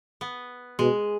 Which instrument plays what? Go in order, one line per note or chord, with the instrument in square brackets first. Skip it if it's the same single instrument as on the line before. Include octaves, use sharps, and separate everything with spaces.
[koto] B3
[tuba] B2 [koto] G#3